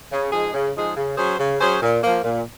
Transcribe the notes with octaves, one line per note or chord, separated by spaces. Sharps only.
C#3
F3 G#3 D#4 G#4
C#3
F3 G#3 D#4 G#4
C#3
F#3 C#4 G#4 C5
C#3
F#3 C#4 G#4 C5
A#2
F3 A#3
A#2